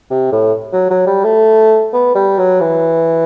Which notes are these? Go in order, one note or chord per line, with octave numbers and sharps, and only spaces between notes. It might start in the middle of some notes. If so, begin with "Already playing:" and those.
C3
A2
F#3
F#3
G3
A3
B3
G3
F#3
E3